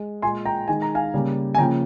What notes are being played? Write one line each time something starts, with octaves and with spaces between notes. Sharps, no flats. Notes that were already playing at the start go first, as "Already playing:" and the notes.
Already playing: G#3
A#2 G#3 G#5 C6
G5 A#5
D#3 G#3 G#5
A#5
F5 G#5
C#3 G3 A#3
G#5
C#3 F3 A#3 G5 A#5